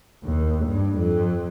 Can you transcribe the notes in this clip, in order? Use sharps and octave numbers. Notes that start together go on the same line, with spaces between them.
D#2
G2
F2